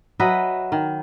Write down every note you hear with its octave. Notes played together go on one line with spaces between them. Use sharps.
F#3 B4 D#5 E5
D#3